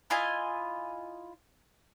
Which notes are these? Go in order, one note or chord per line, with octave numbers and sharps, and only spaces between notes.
E4 F4 D#5 G#5